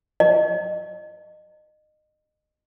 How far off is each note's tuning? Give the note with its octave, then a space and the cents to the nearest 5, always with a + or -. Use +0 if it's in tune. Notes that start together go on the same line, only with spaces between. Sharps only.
D#5 -25